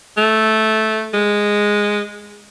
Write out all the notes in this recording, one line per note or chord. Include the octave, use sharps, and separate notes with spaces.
A3
G#3